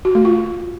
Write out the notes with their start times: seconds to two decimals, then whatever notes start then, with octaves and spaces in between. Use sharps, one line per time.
0.05 F#4
0.15 A3
0.25 F4